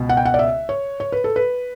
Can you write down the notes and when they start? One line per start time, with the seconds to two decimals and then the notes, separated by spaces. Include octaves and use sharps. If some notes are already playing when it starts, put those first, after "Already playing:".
Already playing: C#2 B2
0.09 F#5
0.17 G5
0.25 F#5
0.34 D5
0.39 E5
0.69 C#5
1.00 C#5
1.12 B4
1.24 A4
1.36 B4